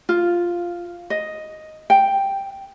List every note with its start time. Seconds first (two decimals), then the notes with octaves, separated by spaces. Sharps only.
0.09 F4
1.10 D#5
1.90 G5